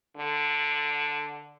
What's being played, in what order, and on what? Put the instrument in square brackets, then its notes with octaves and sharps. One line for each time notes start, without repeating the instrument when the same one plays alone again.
[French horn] D3